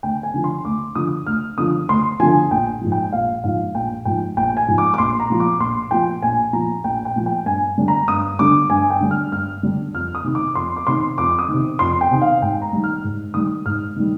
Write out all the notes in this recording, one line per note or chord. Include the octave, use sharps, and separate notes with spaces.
D2 G5
G#5
D3 F3
C6
D2 D6
D3 F3 D#6
D2 F6
D3 F3 D#6
D2 C6
D3 F3 G#5
A#1 G5
G#2 F3
G5
A#1 F5
G#2 F3 F5
A#1 G5
G#2 F3 G5
A#1 G5
G#5
G#2 F3
D6
D6
A#1 C6
A#5
A#2 F3
D6
A#1 C6
A#2 F3 G5
A#1 G#5
A#2 F3 A#5
A#1 G5
G5
A#2 F3
G5
G2 G#5
D3 G3 D4
A#5
G2 D#6
D3 G3 D4 D6
G2 G#5
G5
D3 G3 D4
F6
G2 F6
D3 G3 D4
F2 F6
D#6
C3 D#3
D6
F2 C6
D6
C3 D#3 C6
F2 D6
D#6
C3 D#3
F2 C6
G5
C3 D#3
F5
G#2 G5
A#5
D#3 G3
F6
G#2
D#3 G3 D#6
G#2 F6
D#3 G3